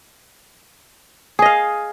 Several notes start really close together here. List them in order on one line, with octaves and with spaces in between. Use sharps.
G#4 D#5 F5